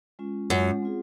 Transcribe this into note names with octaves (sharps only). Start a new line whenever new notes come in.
G#3 C#4 F4
F#2 G#3 C#4 F4
C4 F4 G#4